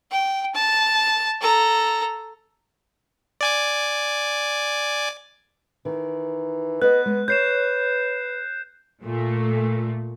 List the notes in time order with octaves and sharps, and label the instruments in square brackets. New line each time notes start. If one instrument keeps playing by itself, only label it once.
[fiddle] G5
A5
A4 A#5
[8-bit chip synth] D5 G#5 D6
[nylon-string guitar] D#3 [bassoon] E3
[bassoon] B3 [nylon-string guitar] B4 D#5 [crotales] F#6
[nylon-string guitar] G#3
[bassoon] B4 [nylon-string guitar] C#5 [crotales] G6 C7 E7
[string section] A#2 A3